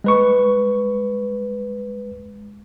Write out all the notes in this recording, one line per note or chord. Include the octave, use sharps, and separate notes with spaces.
G#3 B4 C#6